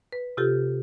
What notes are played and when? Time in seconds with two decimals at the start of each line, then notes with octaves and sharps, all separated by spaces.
0.12 B4
0.37 C3 F4 G4 A4